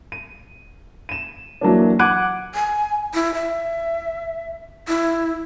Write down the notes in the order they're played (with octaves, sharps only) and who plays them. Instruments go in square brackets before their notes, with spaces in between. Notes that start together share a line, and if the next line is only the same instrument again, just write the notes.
[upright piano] D#7
D#7 E7
E3 F#3 A#3 D4
F#5 D6 F#6 G#6 D7 D#7
[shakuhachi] G#5
E4
E5
E4